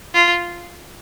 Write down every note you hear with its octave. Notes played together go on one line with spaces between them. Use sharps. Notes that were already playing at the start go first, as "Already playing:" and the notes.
F4